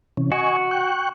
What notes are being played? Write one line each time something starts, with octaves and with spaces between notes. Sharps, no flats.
C3 E3 C#4
F#4 D#5 G#5 C#6
G5 C#6 F#6